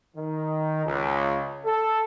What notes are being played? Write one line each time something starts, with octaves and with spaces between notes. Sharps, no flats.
D#3
C#2
A4